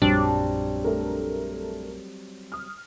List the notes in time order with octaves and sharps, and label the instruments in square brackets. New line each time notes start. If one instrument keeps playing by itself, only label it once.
[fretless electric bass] A#1 F#2 [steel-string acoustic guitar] F#3 G3 C4 [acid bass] D4
[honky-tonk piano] A3 A4 A#4
D#6 F6